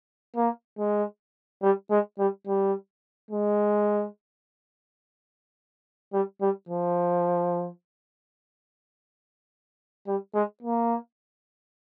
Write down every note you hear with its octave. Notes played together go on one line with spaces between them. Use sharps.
A#3
G#3
G3
G#3
G3
G3
G#3
G3
G3
F3
G3
G#3
A#3